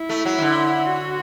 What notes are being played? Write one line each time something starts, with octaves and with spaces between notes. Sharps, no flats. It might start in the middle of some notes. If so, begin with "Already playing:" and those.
Already playing: E4
A3
F#3
E3
D3
F#4